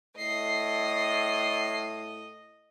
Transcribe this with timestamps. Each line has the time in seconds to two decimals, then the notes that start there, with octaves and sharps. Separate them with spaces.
0.17 A2 D#5 C7